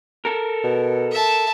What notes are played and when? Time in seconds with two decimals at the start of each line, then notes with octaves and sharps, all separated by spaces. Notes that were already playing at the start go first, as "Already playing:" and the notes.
0.25 A4 A#4
0.64 B2
1.12 E5 A5